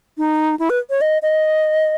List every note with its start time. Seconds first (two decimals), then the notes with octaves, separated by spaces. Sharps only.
0.18 D#4
0.59 E4
0.70 B4
0.90 C#5
1.01 D#5
1.22 D#5